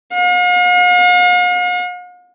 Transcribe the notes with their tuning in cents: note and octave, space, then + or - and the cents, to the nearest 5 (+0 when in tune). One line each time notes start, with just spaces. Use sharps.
F5 +45